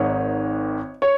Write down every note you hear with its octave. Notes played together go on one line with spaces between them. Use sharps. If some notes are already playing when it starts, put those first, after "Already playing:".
Already playing: G#1 G#2 D#3 C#5
C#5